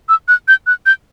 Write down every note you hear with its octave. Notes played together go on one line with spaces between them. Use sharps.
E6
F#6
G6
F#6
G6